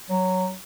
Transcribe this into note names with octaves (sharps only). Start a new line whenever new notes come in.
F#3